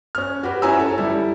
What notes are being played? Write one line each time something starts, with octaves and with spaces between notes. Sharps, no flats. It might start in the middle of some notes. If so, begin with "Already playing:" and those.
C#4 F6
F#4 G4 B4
C#4 E4 G#5 A#5 E6
A4
G3 E4